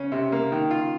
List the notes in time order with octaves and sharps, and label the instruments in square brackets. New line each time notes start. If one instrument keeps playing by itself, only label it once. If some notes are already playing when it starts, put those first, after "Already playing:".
Already playing: [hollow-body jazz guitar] C#3 [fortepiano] C#4
[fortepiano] C3
A#3
D#3
F4